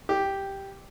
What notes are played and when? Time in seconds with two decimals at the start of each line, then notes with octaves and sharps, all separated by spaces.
0.09 G4